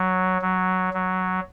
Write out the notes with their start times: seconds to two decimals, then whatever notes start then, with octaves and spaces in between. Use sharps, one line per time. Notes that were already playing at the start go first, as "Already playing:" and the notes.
Already playing: F#3
0.42 F#3
0.94 F#3